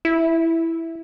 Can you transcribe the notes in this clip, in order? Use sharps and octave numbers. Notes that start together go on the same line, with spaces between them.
E4